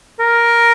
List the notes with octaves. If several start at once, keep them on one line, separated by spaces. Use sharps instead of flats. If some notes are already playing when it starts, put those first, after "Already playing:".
A#4